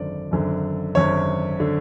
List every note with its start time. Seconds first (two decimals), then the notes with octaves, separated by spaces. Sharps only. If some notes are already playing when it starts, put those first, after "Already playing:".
Already playing: G#1 F#2 D3 D5
0.31 G#1 F#2 D3
0.95 G#1 F#2 D3 C#5
1.60 D3